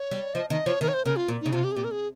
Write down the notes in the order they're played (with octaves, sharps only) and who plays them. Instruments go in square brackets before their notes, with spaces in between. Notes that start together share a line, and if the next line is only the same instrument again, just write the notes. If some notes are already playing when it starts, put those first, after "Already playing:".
Already playing: [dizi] C#5
[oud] G3
[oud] F3 [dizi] D#5
[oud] D#3 [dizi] D#5
[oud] F3 [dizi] C#5
[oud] D#3 [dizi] A#4
[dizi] C#5
C5
[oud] C#3 [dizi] A#4
[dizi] F4
[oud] A#2
[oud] C#3 [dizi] D#4
[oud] C3 [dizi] F4
[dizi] G4
G#4
[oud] A#2 [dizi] G4
[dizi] A#4
G#4